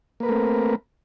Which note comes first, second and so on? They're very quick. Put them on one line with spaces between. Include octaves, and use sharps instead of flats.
A#3 B4 A#4 A3 C4